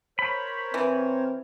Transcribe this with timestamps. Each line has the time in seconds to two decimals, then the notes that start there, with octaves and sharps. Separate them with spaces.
0.19 A#4 C5 C#5 B5
0.74 E3 C4